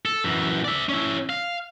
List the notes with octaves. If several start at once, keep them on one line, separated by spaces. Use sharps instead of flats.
A4
F#2 E3
D5 E5
C#4 E4
F5